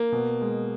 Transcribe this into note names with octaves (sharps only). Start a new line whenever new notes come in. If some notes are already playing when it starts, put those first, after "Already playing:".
Already playing: A#3
B2
G#3